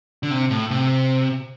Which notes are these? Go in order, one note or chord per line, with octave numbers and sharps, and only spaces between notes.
D3
C3
A2
C3